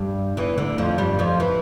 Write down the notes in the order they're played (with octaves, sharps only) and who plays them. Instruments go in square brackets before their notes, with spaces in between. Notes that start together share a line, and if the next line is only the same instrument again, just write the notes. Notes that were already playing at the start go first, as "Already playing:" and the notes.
Already playing: [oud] G2 G3
E2 E3
D2 D3
F2 F3
G2 G3
F2 F3
E3